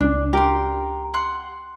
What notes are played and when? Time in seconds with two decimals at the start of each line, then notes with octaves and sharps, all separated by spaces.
0.01 C#2 C#4 D4
0.33 G4 A#4 C6
1.14 F#5 C6 F#6